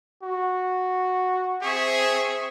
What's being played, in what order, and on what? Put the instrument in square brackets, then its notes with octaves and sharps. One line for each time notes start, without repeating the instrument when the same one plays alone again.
[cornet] F#4
[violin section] C4 E5 C#6 [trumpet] G#4